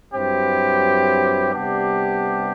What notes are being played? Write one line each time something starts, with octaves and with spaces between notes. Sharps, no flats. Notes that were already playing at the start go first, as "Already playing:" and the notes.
G2 F#3 C4 E4 G4
C3 G3 B3 D4 G4